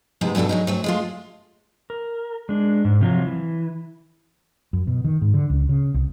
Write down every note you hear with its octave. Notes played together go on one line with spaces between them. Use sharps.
G#2 C3 G#3 A3 B3 E4
G2 B2 A3 D4 A4
F#3 G#3 D#4
F#3 A3 C4
G#3 A3 F4
A#4
G#3 D4
G#2
C3 F3 F#3
E3
F#2
B2
D#3
G#2
D3
C#2
C#3
C2